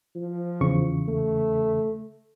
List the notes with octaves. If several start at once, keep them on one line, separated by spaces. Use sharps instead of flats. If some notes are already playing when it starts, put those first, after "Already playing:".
F3
E2 C#3 C#6
A3